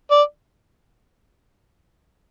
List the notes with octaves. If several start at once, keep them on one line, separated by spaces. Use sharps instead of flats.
D5